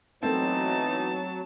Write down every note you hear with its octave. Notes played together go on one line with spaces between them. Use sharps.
E3 F#3 A3 B3 C4 D#4 A5